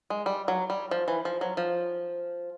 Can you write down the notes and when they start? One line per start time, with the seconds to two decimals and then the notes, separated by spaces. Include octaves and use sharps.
0.10 G#3
0.26 G3
0.48 F#3
0.70 G3
0.91 F3
1.08 E3
1.25 F3
1.41 F#3
1.57 F3